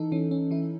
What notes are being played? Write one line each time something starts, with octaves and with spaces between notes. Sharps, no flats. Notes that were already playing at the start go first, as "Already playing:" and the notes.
Already playing: E3 D#4 A4
E3 C#4
C#4
E3 E4